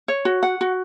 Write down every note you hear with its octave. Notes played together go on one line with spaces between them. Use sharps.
C#5
F#4
F#5
F#4